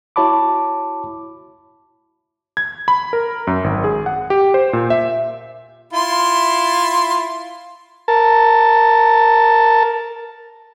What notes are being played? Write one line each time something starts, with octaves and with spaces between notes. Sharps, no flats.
E4 F#4 C#5 A5 B5 D6
G#6
B5
A#4
F#2
G#1
G#4
F#5
G4
C5
A#2
E5
E4 F4 C6
A#4 A5